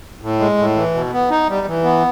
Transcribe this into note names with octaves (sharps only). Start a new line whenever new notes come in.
A2
G#3
A2
E3
B2
B3
D#4
G3
E3
B3